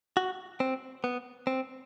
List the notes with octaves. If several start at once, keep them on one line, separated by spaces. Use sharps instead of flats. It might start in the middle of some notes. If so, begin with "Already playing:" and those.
F#4
C4
B3
C4